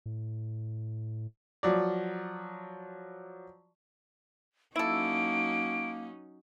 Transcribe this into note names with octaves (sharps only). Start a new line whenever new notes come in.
A2
F3 F#3 D5
F#3 A#3 C#4 D#4 E4 A4 D7